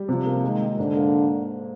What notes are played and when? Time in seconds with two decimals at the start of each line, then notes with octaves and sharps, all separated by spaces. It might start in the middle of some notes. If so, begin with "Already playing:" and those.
Already playing: G3
0.09 C3 F3
0.26 A#3
0.43 D#3 G#3
0.61 G#3
0.79 G#2 D3
0.96 A#3